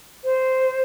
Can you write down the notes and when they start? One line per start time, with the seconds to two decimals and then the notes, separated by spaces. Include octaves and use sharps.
0.24 C5